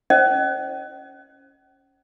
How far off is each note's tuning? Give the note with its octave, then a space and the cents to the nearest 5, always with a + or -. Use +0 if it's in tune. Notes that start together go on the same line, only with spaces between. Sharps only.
C#4 +0 C5 +30 D#5 -35